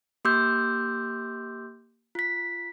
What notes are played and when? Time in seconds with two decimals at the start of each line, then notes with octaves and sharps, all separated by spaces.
0.25 A#3 G4 C6 D6 E6 G6
2.15 F4 B6